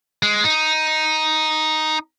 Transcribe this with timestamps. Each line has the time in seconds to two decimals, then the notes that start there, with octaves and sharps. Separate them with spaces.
0.23 G#3
0.44 D#4